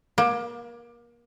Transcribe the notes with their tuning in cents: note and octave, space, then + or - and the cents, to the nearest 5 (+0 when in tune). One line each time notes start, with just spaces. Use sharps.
A#3 +30